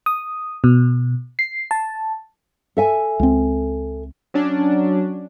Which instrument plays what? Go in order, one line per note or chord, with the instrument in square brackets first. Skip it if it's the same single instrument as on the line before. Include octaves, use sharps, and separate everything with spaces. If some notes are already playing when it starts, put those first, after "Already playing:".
[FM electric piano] D#6
B2
C7
A5
[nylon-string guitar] A4 E5 G#5
[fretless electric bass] C#2 C4
[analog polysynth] F#3 C#4 D4